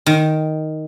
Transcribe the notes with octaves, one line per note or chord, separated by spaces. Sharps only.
D#3